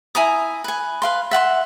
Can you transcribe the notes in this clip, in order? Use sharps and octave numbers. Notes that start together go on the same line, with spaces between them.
E4 G#5 A#5 D#6
B4 G#5
B4 F5 C6
E5 F#5 G5 C6